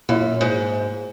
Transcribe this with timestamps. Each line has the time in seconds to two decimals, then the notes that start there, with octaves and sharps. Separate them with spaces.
0.09 F#2 A#2 A#3 E4
0.41 G#2